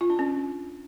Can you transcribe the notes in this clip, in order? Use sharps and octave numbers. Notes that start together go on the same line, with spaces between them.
F4
D4
C#4